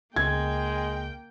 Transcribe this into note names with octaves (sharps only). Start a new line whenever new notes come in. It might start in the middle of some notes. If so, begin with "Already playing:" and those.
C#2 G#3 A#3 G5 G#6